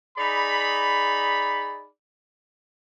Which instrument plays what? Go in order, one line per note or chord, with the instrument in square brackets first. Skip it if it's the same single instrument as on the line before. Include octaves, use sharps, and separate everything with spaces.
[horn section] D#4 G#4 D5 B5